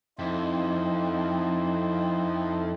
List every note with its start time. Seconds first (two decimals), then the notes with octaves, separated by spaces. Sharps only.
0.19 F2 D#4 E4 C5